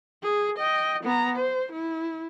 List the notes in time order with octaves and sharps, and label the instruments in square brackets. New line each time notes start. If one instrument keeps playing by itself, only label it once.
[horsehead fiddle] G#4
D#5 G5
B3 A#5
C5
E4